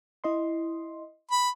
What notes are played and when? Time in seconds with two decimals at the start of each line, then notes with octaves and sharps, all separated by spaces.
0.24 E4 D#5 C6
1.31 B5